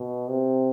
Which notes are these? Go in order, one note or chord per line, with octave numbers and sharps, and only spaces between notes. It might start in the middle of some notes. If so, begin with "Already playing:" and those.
Already playing: B2
C3